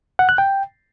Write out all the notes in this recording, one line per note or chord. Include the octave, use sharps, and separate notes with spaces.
F#5
F#6
G5